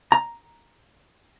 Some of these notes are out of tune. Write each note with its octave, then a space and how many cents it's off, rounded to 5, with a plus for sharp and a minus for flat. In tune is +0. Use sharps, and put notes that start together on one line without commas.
A#5 +5